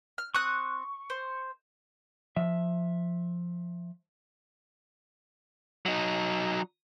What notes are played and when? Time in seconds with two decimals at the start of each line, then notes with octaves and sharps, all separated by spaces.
0.18 F6
0.35 C4 C#6 D#6 F#6
1.10 C5
2.37 F3 E5
5.86 F#3 D#4